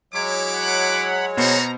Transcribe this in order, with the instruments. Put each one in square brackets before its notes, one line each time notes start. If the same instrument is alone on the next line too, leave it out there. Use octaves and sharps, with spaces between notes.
[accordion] F#3 G#3 C#5 [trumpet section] E4 D6
[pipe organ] F#5 B5
[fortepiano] B2 C5 [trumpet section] B3 C#4 F#4 [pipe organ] A#5